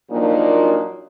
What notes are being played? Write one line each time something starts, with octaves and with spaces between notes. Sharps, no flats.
A#2 F3 F#3 A#3 D4 D#4